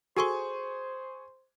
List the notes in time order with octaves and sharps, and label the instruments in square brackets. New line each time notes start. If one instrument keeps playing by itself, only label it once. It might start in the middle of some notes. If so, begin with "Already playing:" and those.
[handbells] F#4 A4 C6 [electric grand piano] G#4 G#5 C#6 [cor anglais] C5